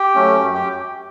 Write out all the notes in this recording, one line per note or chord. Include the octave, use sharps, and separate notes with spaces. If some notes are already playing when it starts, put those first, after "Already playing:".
Already playing: G4 G5
F#3 A3 C#4
F#2
G4 G5